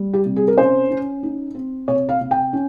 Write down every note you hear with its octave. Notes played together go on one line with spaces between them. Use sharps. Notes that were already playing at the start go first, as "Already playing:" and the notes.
Already playing: G3
G4
C3
G#4
A#4
C#4 C5
C#4
D#4
C4
C3 C#5
F5
C3
G5
C#4